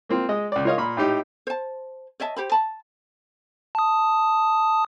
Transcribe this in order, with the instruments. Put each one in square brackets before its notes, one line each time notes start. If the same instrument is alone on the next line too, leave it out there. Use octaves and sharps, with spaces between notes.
[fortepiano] A#3 C4 F4
G#3 D#5
C#2 D5
F4 A#4 C#5 D#5 F5
A#2 B5
A2 D#4 G4
[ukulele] C5 A5
C#5 D#5 E5 A5
G4 C5 B5
A5 B5
[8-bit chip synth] A5 D#6